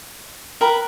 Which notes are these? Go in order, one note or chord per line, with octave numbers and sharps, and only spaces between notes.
A#4 B4 G5 A#5 B5